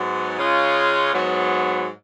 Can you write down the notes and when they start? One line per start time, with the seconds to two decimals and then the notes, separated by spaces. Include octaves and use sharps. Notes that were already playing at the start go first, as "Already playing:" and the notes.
Already playing: G#2 F#3 B3
0.36 C#3 G#3 C#4 F4
1.12 G#2 F#3 B3